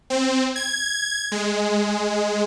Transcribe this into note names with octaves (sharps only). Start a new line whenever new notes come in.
C4
G#6
G#3